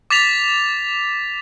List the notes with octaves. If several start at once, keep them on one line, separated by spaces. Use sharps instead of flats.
D6 A6 B6 F7